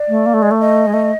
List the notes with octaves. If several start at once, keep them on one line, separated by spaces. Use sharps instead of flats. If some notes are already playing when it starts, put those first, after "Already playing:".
Already playing: D5
A3
A#3
A3
G#3
A3
D#5
G#3
A3